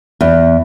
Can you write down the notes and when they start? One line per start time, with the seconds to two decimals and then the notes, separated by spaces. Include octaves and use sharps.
0.21 E2